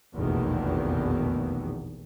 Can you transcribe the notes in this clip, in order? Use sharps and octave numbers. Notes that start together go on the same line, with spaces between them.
F1 A#1 E2 B2 D#3